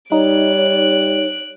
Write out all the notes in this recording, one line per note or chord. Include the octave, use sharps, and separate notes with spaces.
G3 D#4 C#5 F#6 D7